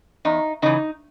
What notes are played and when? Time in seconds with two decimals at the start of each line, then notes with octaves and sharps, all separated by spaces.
0.25 E2 D#4
0.62 C#3 E3 D#4